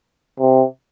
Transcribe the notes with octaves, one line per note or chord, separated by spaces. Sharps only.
C3